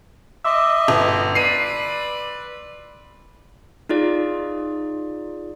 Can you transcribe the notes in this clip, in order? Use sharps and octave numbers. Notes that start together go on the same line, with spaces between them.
D#5 E5 C6 D6 E6
G1
B4 D5 C7 D#7
D#4 F4 G#4 D5